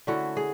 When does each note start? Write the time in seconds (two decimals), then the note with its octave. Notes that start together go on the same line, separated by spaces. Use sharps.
0.07 D3 A3 C#4 E4 F#4
0.37 G#4